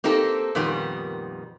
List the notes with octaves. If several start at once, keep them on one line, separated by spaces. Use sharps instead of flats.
A#3 C4 D#4 G4 A4
F2 A#2 D#3 G3 B3